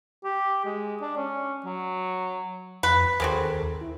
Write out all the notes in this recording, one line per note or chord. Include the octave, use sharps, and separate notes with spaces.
G4
G#3
D4
C#4
F#3
F2 B4
D#2 G#3 C4 F#4 A4 A#4
E4